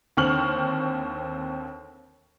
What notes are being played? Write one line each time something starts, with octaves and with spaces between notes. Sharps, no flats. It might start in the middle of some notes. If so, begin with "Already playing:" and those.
D#2 D3 C4 C#6 F6 F#7